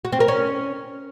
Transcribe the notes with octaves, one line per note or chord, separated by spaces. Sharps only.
F#4
C4
A#4
C#4